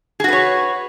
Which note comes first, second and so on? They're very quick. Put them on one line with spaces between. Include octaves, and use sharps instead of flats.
G#4 F#4 B4 C#5